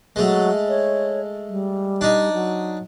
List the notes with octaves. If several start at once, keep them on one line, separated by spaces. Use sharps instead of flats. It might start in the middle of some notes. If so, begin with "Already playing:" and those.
F#3 G#3 A3
C#5
G3
D4 D#4
F#3